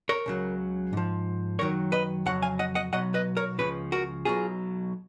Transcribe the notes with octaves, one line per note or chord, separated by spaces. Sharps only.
A#4 C#5
C#2 C#3 F#3
G#2 F3
F#2 D#3 F#3 A#4 C#5
B4 D#5
F2 C#3 F#3 F#5
F5 G#5
D#5 F#5
D#5 F#5
B1 B2 F#3 D#5 F#5
B4 D#5
A#4 C#5
C#2 C#3 F3 B4
F#4 A#4
B1 B2 F#3 F4 G#4